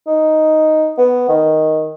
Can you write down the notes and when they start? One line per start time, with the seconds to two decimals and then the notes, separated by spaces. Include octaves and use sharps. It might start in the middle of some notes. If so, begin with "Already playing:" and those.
0.07 D#4
0.98 B3
1.29 D#3